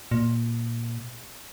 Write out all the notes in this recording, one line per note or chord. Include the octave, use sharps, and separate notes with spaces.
A#2